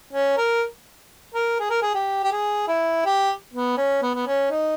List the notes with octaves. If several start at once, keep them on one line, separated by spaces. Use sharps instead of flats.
C#4
A#4
A#4
G#4
A#4
G#4
G4
G4
G#4
E4
G4
B3
C#4
B3
B3
C#4
D#4